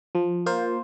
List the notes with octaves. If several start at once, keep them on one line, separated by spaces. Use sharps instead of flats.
F3
A#3 F4 C5